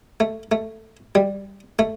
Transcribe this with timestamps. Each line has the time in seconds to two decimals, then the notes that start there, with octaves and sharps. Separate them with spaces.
0.20 A3
0.52 A3
1.15 G3
1.79 A3